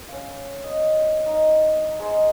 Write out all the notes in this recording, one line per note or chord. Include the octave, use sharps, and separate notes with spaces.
C#4 F5
D#5
D#4
G#3 G#4 C5 D#5